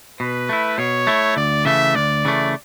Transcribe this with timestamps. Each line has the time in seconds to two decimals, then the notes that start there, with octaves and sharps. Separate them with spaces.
0.20 B2 B4
0.49 A3 E4
0.78 B2 C#5
1.07 A3 E4
1.37 D2 D5
1.65 C#3 E3 A3 E5
1.95 D2 D5
2.25 C#3 E3 A3